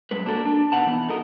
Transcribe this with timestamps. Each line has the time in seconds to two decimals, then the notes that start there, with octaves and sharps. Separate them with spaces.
0.11 F#2 G#3 B4
0.25 A#3 D4 F#4 G4 A4 A#4
0.45 D4 A5
0.72 B2 D#4 B4 F#5 A5
0.87 E3 B3
1.08 D#4 F#4 A4 A#4 D#5